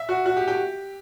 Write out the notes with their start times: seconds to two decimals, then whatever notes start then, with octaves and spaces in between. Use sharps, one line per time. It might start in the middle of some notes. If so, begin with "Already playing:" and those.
Already playing: E5
0.09 F#4
0.26 F#4
0.37 G4
0.48 G4